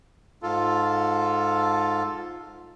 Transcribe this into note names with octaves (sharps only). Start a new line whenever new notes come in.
G#2 F4 A4